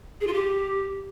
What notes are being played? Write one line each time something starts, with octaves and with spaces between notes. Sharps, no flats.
G#4
F4
G4